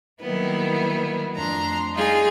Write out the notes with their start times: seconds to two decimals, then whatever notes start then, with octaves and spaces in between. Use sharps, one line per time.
0.21 D#3 F#3 G3 A#3 B3 E4
1.35 F2 A3 D4 A#5 C6
1.94 G3 D#4 F4 G#4